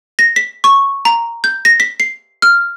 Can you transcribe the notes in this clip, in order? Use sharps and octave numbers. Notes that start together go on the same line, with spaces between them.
A#6
B6
C#6
A#5
G6
A#6
B6
C7
F6